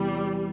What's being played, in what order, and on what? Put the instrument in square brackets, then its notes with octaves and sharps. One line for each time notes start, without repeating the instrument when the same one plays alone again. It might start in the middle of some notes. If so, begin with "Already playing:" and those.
Already playing: [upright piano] E2 C3 E3 [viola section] G3